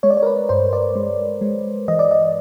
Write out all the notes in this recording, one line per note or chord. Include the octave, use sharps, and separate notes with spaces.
G#3 C#5
D5
C#5
A#4
B4
G2 C5
D5
G#3
G#3
E3 D#5
D5
D#5